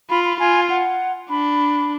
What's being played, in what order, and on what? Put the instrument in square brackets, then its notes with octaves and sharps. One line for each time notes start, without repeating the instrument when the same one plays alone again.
[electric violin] F4 [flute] B5
[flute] B5
[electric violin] F4 [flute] G#5
[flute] F#5
[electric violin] D4 [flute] B5